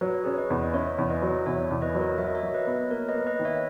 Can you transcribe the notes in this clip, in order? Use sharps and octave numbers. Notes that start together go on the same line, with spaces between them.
F#3 B4
C#5
C#4 G#4 B4
B4 D#5
E2
D#5
C#4 C#5 E5
E2
B4 D#5
F#3
E2 C#5 E5
E2
B4 D#5
F#3
A#4 C#5
F#3 E5
D#5
C#5 E5
F#3
B4 D#5
B3
A#3 A#4 C#5
B4 D#5
A#3
B4 D#5
D#3
C#5 E5